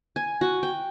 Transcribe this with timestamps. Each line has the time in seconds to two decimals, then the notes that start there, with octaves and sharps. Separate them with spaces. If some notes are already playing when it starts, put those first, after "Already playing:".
0.16 G#5
0.41 F#4
0.63 G5